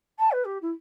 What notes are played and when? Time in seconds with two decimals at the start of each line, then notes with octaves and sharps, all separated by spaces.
0.19 A5
0.31 B4
0.44 G4
0.62 E4